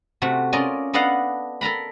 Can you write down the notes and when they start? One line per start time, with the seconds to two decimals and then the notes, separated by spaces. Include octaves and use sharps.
0.22 C3 A3 F#4
0.53 C#4 F4 A#4 D5 D#5
0.93 B3 D4 A4 D#5 F5 F#5
1.61 A4 A#4 A#5 B5